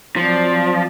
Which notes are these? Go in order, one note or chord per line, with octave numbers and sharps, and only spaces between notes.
F3 F#3 C4 D5